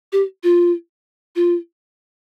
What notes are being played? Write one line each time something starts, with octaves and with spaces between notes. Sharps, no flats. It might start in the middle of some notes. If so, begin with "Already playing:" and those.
G4
F4
F4